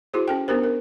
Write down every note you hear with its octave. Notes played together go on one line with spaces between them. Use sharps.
E4 F#4 G#4 C5
C#4 A4 G5
B3 D4 G4 A#4 C5
A#4